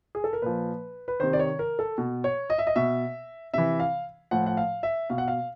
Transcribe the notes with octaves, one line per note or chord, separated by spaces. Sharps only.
G#4
A4
A#4
A#2 F3 B4
B4
C3 D#3 C5
D5
C#5
A#4
A4
B2
C#5
D#5
E5
D#5
B2 E5
C3 E3 E5
F5
A2 F3 F#5
F#5
F5
E5
B2 F5
F#5
F5